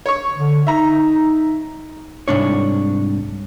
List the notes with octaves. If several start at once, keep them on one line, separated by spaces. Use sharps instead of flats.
C#5 C#6
D3
D#4 E5 A#5
C2 G#2 D4 C#5